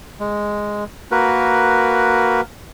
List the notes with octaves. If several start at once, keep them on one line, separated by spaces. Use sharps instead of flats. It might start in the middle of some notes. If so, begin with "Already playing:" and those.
G#3
A#3 F#4 A#4 B4